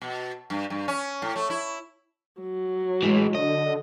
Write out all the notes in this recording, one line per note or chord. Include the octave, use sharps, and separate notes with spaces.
B2
G2
G2
C#4
A2
A3
E4
F#3
A2 E3 G#3
D3 D#5